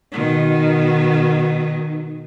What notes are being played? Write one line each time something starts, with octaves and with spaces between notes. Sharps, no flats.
B2 D#3